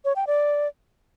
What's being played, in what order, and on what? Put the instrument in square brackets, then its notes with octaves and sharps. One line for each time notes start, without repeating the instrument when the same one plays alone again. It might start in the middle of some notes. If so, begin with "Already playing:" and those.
[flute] C#5
G5
D5